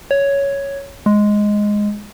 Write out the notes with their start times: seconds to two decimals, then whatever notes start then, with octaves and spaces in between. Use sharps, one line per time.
0.11 C#5
1.06 G#3